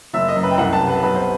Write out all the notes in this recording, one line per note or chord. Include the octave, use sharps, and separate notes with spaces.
F#1 E5
D#5
F#2
B4
G5
C2 F#5
A5
C3
B4
B1 B4
C5